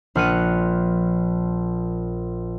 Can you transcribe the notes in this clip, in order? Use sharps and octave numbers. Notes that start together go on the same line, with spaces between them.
A#1 F6 F#6 C#7 D#7